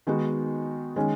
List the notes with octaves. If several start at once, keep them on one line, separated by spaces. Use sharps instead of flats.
D#3 G#3 B3 D#4 F#4
D#3 G#3 C#4